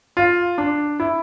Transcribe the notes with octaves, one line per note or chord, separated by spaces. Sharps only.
F4
D4
E4